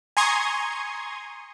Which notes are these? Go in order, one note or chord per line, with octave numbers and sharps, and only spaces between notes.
G#5 A#5 C6 C#6 D#6 G#6